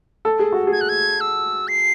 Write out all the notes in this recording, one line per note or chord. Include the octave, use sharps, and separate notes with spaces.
A4
G#4
F#4
G#4
G#6
F#6
G#6
E6
C7